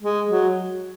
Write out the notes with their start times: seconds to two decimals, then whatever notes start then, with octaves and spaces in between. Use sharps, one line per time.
0.02 G#3
0.29 F#3